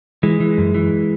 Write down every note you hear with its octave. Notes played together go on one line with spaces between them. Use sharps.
E3 G#3
E3
F#2
E3